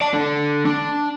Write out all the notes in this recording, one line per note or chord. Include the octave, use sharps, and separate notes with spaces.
D5 A5
D3
D4